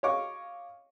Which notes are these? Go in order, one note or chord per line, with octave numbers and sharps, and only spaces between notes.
C#5 D#5 F5 C#6 D6